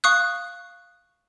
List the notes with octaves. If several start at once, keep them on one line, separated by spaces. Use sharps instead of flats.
F5 C#6 D#6 F#6